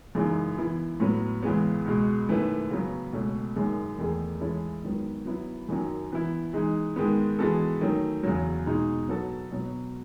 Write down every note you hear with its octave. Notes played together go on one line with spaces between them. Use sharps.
F#2 C#3 E3 G#3 D#4
E3 B3 E4
A2 F#3 B3
C#2 C#3 E3 G#3 B3
C#2 B2 G#3
F#2 D#3 A3 E4 B4
C#3 F#3 B3
C#2 B2 A3 C#4
F#2 D#3 G#3
E2 D#3 A3 D#4 G#4
E3 G#3 C#4 E4 A4
G#2 D#3 F#3 B3 F#4
F#3 B3 E4
F#2 D#3 F#3 C#4
E3 B3 E4
E3 G#3 D#4
G#2 D#3 G#3 B3
E3 G#3 B3 F#4 A4
D#3 F#3 A3 C#4
E2 C#3 F#3
B2 G#3 D#4 G#4
F#3 B3 F#4 A4
B2 F#3 B3